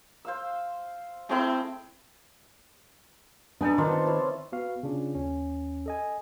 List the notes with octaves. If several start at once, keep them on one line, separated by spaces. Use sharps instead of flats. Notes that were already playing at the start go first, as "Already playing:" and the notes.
C5 F5 E6
G#3 A3 C4 E4
B3 D4 D#4 A4 G#5
D#3 C4 D4 F4 C5
E4 C5 C#5
B3 F#4 F5
C#3 D4 F4
D#2 C#4
A4 D#5 G#5